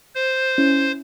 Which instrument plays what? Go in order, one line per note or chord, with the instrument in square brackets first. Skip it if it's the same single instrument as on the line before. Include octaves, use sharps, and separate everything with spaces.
[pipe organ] C5
[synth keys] C#4 E4